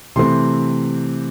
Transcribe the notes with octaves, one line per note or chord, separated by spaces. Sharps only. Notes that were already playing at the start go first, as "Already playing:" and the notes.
C3 E3 A3 C4 C6